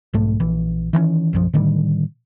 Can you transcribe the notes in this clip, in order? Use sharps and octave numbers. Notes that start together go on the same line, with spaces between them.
B1 G#2 A3
A#1 E3
D#3 E3 G3 C#4
B1 F#2 F3
A2 D3 D#3 G3